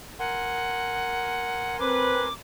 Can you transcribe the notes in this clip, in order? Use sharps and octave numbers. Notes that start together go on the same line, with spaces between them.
A#4 F#5 G#5 C6
C4 B4 D6